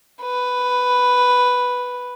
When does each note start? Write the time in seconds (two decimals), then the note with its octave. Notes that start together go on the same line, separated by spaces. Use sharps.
0.22 B4